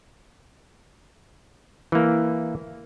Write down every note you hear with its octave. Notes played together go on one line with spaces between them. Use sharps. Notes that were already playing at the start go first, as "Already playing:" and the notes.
E3 A#3